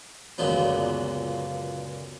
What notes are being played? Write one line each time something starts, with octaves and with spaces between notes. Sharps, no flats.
C#2 F#2 A#2 D3 F#3 B3